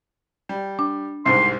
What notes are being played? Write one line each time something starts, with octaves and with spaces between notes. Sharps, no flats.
G3
D4
C2 G#2 C3 C6